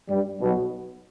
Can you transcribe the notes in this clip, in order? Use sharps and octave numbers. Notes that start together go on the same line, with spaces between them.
G2 G3
B1 B2